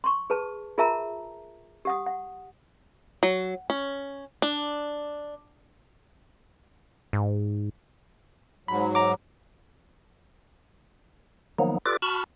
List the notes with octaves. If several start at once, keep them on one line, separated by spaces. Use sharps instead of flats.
C6 C#6
G#4 B4 A5
F4 G#4 A#4 E5 A5 A#5
G4 F#5 D#6
F#5
F#3
C#4
D4
G#2
G#2 F#3 B5
A#5 D6
D#3 F3 F#3 A#3 B3 D#4
F4 G4 A4 B4 D5 D6
F#4 A5 B5 C#6 F6